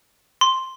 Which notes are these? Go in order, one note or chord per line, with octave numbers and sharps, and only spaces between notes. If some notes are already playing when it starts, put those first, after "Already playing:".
C6